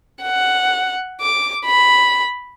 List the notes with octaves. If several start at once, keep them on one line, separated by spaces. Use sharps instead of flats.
F#5
D6
B5